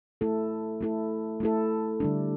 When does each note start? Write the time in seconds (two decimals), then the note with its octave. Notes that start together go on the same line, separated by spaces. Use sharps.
0.21 A3 E4 A4
0.81 A3 E4 A4
1.40 A3 E4 A4
2.00 D3 G3 D4